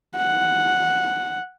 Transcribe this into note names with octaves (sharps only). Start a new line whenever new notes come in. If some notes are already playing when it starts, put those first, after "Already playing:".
F#5